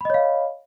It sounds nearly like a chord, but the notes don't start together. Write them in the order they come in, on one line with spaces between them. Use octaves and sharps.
B5 D#5 C#5 F5